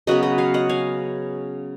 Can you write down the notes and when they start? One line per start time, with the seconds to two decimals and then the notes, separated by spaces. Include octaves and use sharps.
0.07 C#3 F#3 B3 B4 D#5
0.23 B4 D#5
0.38 C#5 F5
0.54 D#5 F#5
0.69 F5 G#5